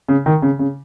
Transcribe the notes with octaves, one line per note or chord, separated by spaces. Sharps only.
C#3
D#3
C#3
C#3